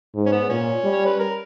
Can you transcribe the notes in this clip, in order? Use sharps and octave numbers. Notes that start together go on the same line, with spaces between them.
G#2
C#4
B3
A#2 C#4
G3
C#5
B4
A#4